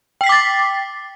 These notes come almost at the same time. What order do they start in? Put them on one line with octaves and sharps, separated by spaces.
G5 C7 B6 D6 A6